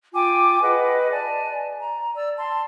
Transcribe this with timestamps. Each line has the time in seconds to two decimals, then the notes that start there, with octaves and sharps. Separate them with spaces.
0.14 F4 G5 G#5 D6
0.61 G#4 B4 D#5 F#5
1.11 D5 G#5 A5
1.80 A#5
2.15 D5 E6
2.37 A5 C6